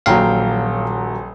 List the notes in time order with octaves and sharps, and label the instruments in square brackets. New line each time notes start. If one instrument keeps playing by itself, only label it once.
[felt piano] D#1 F#3 [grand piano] A#1 G5 A#5 [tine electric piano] F5